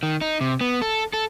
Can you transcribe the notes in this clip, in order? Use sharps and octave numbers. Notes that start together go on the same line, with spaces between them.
D#3
D#4
C3
B3
A4
A4